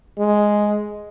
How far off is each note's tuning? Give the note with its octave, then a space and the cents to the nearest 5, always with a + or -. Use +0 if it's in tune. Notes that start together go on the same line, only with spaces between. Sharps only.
G#3 +5